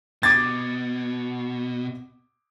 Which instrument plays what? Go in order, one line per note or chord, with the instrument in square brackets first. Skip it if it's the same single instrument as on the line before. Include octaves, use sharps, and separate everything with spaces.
[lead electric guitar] B2 [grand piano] D6 G#6 A6